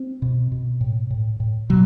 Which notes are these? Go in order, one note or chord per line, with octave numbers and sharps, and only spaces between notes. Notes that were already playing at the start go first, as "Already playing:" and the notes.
Already playing: C4
B2
B2
A2
A2
A2
B2 F#3